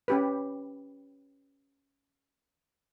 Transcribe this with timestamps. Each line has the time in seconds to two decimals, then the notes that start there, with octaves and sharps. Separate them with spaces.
0.08 C#4 G4 B4